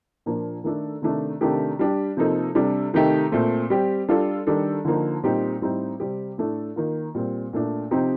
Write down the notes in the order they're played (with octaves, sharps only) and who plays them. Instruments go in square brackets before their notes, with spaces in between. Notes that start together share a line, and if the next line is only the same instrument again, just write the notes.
[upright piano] A#2 F3 A#3 D4
D#3 A3 D4 A4
C3 D#3 A3 D4
C3 D#3 A3 D4 G4
G3 D4 G4
C3 F3 A#3 D#4 A4
C3 G3 D4 A4
C3 D#3 A3 D#4 G4
A#2 A3 C4
G3 C4 G4
G3 D4 F4 A4
D#3 G3 D4 A4
D3 F3 A#3 D#4
A#2 G3 C4 D#4 G4
A2 G3 C4 D#4 G4
C3 G3 C4 G4
A2 A3 D4 A4
D#3 A#3 F4
A#2 G3 C4
A#2 A3 D4
C3 F3 C4 D#4 G4